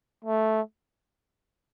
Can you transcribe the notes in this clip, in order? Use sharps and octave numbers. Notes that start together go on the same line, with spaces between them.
A3